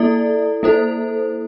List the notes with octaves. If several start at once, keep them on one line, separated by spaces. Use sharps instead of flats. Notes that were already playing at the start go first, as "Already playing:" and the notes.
Already playing: A#3 E4 A4 D5
A#3 E4 A4 C5